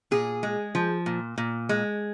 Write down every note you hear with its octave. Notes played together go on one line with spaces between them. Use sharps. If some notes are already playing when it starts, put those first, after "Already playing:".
A#2 G#4
G#3
F3
A#2
A#2
G#3